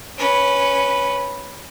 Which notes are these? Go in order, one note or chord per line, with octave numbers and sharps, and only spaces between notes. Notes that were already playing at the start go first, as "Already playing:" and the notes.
C#4 B4